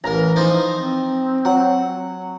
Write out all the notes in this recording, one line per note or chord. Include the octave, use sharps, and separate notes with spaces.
A1 E3 A#4 A#5
F3 D#4 C5
C4
F#3 F#5